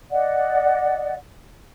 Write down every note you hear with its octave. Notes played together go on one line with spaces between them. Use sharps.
D5 D#5 F#5